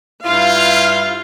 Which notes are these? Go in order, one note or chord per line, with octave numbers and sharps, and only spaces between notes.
G2 E4 F4 F5